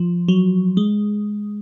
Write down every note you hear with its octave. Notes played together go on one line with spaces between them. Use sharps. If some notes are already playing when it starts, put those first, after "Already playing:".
Already playing: F3
F#3
G#3